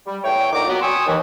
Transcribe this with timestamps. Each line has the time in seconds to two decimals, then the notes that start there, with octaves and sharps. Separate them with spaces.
0.06 G3
0.24 E2 A2 C#5 G5
0.53 A#2 D3 D#3 A#5 D6
0.68 F#3 B3
0.81 G5 G#5 C6 C#6 D#6 E6
1.06 D#2 E3